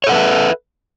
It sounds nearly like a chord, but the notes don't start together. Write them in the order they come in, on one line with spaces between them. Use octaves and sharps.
C#5 A4 F#5 B4 E5